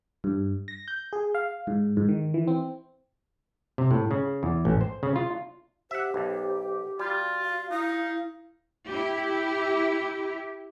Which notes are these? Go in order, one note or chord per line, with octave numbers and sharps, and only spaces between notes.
G2
A#6
G6
G#4
F5
G#2
G#2
D#3
E3
C4
C3
A2
C#3
E2
A1
C5
C#3
F4
G4 C5 E5 F#5
B1
G3 F4 F#4
F5
D#4 E4 F5
E4 G4